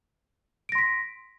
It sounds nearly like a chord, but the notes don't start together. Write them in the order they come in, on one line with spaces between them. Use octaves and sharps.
D7 A#6 C6 B6